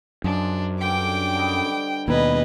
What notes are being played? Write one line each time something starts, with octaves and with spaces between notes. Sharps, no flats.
F#2 F3 G#3 D4
G2 D3 C4 G5 D6
D3 G3 D#5
D#2 B2 E4 B4 D#5 A#5 B5